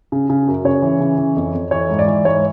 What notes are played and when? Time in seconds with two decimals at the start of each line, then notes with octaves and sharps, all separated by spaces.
0.12 C#3
0.30 C#3
0.47 F#2
0.65 C#3 C#5
0.82 E3
1.00 C#3
1.18 E3
1.36 F2
1.54 F2
1.71 E3 C#5
1.90 G#2
1.99 D5
2.08 E3
2.25 G#2 C#5